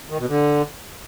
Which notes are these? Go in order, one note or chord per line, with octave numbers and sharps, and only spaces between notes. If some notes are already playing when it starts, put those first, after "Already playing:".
D#3
B2
D3